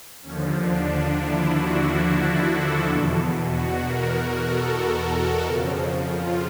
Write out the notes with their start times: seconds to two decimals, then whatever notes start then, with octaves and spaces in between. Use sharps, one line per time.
0.23 D#2 D3 F3 C#4
0.56 D4
0.89 D4
1.21 E4
1.54 F#4
2.19 E4
2.51 A4
2.85 E2 B2
3.49 F#4
3.81 A#4
4.14 A#4
4.47 A4
5.44 F2 C#3 F3
6.10 F4